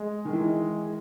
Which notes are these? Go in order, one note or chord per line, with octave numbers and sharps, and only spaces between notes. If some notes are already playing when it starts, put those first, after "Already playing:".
Already playing: G#3
D#3
E3 G#3